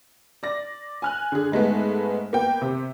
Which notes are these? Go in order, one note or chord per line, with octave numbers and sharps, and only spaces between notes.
D5 A#6
G#5 F6 F#6
D3 G#4
G#2 G#3 A3 B3
A#3 B3 G5
C3